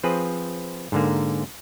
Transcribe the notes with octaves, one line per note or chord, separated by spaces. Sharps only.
F3 C4 G#4 B4
G#2 D3 A#3